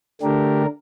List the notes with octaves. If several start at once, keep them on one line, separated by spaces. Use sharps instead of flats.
D3 A3 D4 G4 A#4